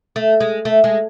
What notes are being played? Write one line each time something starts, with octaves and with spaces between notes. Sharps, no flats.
A3
G#3
A3
G#3